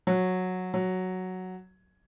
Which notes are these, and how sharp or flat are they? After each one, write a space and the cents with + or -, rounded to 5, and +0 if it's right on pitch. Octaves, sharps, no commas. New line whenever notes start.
F#3 -10
F#3 +0